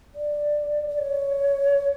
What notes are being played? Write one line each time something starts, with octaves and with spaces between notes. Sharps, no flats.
D5
D5
C#5